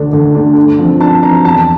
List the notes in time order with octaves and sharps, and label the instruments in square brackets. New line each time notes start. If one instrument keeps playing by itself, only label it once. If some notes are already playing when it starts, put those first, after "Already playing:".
Already playing: [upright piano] D2 D3 A3 D4
D2
D3 A3 D4
G2
F3 C4
G2 A5
F3 C4 A#5
E2 A5